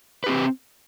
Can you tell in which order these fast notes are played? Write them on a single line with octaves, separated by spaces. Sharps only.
B4 G4 C4